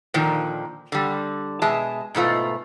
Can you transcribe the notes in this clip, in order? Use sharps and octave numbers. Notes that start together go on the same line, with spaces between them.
A#2 D3 D#3 F3
D3 G3
B2 G#3 G#4 E5 A5
G#2 B2 A3 F4